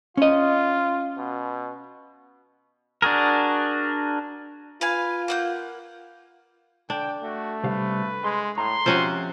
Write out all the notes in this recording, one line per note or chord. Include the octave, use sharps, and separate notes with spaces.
C#4 F4 D#5
B2
D4 F#4 G#4 A#4
F4 B4 F5 G#5
A#3 F#5 G6
D3 D4 G5
A3 F#4
C3 G3 B4 F5
G#3 C6
A2 A#5 C6
C3 F3 C#4 F#4